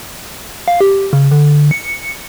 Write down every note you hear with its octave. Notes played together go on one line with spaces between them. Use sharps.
F5
G4
C#3
D3
C#7